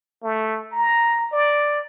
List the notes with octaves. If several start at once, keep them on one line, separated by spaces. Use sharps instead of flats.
A3
A#5
D5